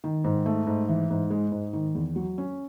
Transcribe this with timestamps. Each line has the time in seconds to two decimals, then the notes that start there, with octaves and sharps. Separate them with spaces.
0.04 D#3
0.24 G#2
0.46 A3
0.67 G#2
0.88 E3
1.10 G#2
1.30 G#3
1.52 G#2
1.73 D#3
1.95 E2
2.16 F#3
2.38 C#4